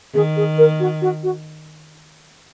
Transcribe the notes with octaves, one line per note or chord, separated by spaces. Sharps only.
D#3 G#4
G#4
A#4
F#4
F#4
F#4